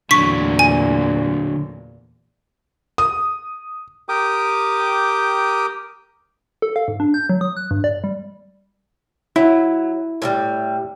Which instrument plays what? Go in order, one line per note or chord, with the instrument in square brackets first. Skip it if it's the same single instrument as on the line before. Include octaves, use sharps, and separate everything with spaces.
[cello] E2 A#2 [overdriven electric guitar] D3 F#3 [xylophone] C#6 B6
[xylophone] G#5
[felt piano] D#6
[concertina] G4 A#4 G5 D6 D#6
[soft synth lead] A4
F5
G#2
D4
G6
F#3
D#6
F#6
G2
D5
G3
[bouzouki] F#3 [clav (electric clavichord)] E4
[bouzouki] A2 D#3 G3